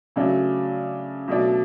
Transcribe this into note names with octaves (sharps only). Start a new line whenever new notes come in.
C#3 F#3 A3 D4
B2 F#3 A3 D4